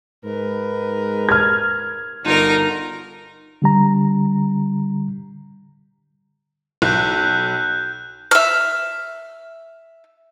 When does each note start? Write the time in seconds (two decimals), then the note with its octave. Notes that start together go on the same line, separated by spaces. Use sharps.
0.24 G#2 A#4 B4
1.29 F6 G#6
2.25 G1 D3 D4 D#4 F4 F#4 A#4
3.62 D3 G3 A#5
6.82 B1 F#6 G6
8.31 E5 F6